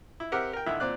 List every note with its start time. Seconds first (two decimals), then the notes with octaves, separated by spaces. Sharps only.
0.20 E4
0.32 C4 G4 A#4 E5 F#5
0.53 A#4 G5
0.66 G#1 D3 E4 E5
0.80 A#2 C4 D5 F#6